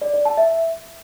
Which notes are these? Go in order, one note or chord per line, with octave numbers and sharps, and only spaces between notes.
D5
D5
A5
E5